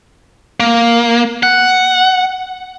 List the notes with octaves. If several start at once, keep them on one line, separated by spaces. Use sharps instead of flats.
A#3
F#5